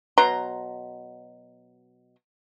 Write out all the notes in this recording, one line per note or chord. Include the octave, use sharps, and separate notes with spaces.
B2 F#3 A#5 C6